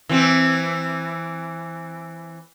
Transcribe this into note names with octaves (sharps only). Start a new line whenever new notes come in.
E3 C4